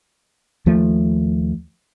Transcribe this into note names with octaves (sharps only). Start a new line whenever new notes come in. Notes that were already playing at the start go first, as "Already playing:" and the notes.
D#2 F3 A3